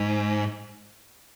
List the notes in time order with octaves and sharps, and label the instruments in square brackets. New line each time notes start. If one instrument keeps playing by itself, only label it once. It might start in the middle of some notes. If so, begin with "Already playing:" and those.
Already playing: [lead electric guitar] G#2